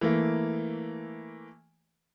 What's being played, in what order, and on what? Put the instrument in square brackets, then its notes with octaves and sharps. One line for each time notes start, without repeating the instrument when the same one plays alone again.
[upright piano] E3 A3 A#3